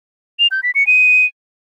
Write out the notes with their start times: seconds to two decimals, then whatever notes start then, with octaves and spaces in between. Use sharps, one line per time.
0.39 F7
0.51 G6
0.63 B6
0.75 C#7
0.87 D#7